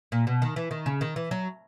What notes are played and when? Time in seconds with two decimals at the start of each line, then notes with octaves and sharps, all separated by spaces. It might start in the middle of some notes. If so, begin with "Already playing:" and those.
0.12 A#2
0.27 B2
0.42 D#3
0.56 E3
0.71 D#3
0.86 C#3
1.01 D#3
1.16 E3
1.31 F#3